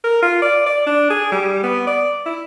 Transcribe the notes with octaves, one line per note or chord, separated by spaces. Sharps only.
A#4
F4
D5
D5
D4
G#4
G3
B3
D5
E4